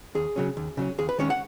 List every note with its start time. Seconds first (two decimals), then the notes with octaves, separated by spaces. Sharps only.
0.15 D#2 G#4
0.36 C#3 F#3 C#4
0.57 D#2
0.77 C#3 F#3 C#4
0.98 D#2 G#4
1.09 B4
1.19 D#3 G#3 C#4 C#5
1.30 F#5